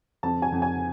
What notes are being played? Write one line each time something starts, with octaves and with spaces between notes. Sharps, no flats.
F2 A5
G#5
F2
G#5